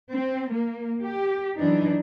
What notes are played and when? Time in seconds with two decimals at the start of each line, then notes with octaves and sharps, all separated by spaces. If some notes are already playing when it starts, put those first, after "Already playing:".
0.12 C4
0.52 A#3
1.01 G4
1.57 F#2 E3 D4 D#4